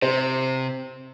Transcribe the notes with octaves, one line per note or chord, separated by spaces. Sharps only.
C3 C5